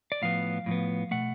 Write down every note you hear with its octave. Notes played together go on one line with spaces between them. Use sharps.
D5
A2 F3 B3 F5
A2 F3 B3
B2 A3 F#5